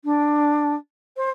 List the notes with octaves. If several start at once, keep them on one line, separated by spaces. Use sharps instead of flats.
D4
C5